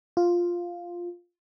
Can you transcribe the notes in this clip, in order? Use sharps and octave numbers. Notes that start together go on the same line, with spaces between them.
F4